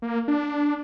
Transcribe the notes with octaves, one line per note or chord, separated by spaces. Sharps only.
A#3
D4